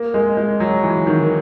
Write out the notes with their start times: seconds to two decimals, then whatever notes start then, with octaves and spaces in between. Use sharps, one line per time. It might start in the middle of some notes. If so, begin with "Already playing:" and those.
Already playing: A#3
0.14 G#3
0.37 G#3
0.60 F#3
0.83 E3
1.06 D#3